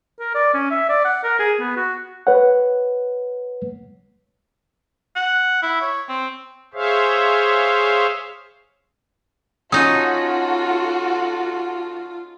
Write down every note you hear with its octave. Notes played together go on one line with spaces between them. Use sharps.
A#4
D5
C#4
E5
D5
F#5
A#4
G#4
B3
F#4
B4 C#5 F#5
F#5
E4
C#5
C4
G#4 C5 C#5 E5 F5
C#4 D#4 F4 F#4 A4 D#6